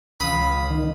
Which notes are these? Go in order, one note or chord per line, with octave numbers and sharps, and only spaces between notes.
C#2 F5 B5 D#6
D#3